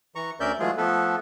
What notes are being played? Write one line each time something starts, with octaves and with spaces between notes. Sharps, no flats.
E3 A#5 C#6
D2 C#4 A#4 D5 E5 G6
E3 F#3 G#3 A3 F4 G#4
F3 A3 B3 A4 B4